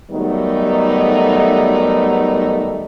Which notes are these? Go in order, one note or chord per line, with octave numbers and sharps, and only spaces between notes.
D#3 F#3 G3 A3 B3 D#4